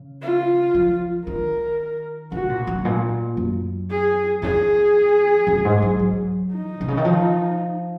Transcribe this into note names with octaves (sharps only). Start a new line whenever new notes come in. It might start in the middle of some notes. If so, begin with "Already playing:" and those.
Already playing: C#3
F4
F3
D#3 A#4
C#3 F#4
A#2
F#2
A#2
F#2
G#4
F2 G#4
F#2
G#2
F#3
F#3
D#4
A#2
C3
C#3
D#3
F3